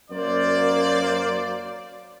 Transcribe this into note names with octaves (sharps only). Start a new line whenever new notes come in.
F#2 A#3 C5 D5